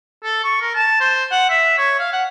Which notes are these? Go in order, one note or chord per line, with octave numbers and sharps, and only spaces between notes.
A4
C#6
A#4
A5
C5
F#5
E5
C#5
F5
F#5